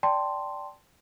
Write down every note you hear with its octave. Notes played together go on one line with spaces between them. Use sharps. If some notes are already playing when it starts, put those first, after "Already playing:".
D5 G5 A5 C6